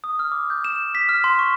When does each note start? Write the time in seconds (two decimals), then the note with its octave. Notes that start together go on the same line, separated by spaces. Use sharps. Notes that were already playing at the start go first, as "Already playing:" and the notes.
0.04 D#6
0.19 F6
0.32 D6
0.50 G6
0.64 E7
0.95 B6
1.09 F6
1.24 C6
1.39 C#6